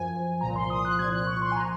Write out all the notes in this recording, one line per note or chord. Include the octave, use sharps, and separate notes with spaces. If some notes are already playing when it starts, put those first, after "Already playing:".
Already playing: F#2 F3 G#5
C2 A#2 F3 A#5
C6
D#6
F#6
C2 A#2 F3 G#6
F#6
C#6
C6
G#5
A#5
F3